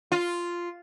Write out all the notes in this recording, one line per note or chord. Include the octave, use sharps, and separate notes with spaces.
F4